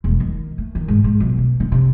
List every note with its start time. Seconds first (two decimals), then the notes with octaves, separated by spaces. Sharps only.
0.04 E1
0.20 D#3
0.58 A3
0.75 D#3
0.88 G#2
1.04 G#2
1.20 B1
1.38 B2
1.60 D3
1.72 C3